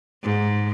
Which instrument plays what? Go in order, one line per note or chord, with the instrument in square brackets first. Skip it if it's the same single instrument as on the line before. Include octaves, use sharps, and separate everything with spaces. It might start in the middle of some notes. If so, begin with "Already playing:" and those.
[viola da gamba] G#2